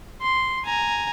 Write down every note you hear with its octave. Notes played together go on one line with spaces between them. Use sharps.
C6
G#5 A#5